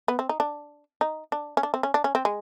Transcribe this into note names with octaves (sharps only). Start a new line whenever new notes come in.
B3
C4
D#4
D4
D#4
D4
C#4
D4
C4
C#4
D4
C#4
C4
G#3